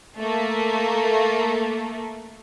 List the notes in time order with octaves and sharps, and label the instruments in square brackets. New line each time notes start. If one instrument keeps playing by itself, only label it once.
[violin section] A3 A#3